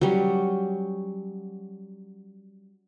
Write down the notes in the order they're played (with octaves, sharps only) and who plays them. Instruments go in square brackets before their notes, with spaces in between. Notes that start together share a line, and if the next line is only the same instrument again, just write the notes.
[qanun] F#3 G3 C#4